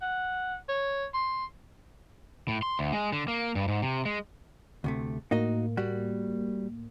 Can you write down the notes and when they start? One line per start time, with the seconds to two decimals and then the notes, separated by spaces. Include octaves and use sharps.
0.02 F#5
0.69 C#5
1.14 C6
2.48 A2
2.62 C6
2.79 D2
2.92 G#3
3.13 D3
3.28 A#3
3.55 G2
3.68 G#2
3.82 C3
4.05 G#3
4.84 D2 C3 A3
5.31 A2 A#3 D#4 F#4 D#5
5.77 G3 F#4